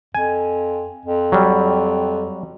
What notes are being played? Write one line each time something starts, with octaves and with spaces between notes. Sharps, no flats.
F2 G#5
F2
F#3 G3